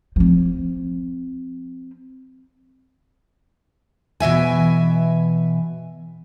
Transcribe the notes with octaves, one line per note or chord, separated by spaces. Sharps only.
F3 C4
B2 E3 E5 G#5